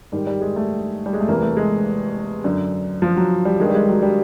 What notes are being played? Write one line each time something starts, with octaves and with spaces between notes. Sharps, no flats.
G#2 D#3 G3
G3
G#3
A3
G3
G#3
A3
E2 C3 E3 A#3
A3
G#3
F#2 D3
F3
F#3
G3
G2 D#3 G#3
G3
G#3
F#3
G3